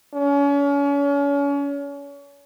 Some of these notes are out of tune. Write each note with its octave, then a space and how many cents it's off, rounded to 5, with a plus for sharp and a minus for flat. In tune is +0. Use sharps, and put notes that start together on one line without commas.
C#4 +35